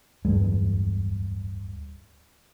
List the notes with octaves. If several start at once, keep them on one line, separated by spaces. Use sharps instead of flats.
D1 E2 G2 G#3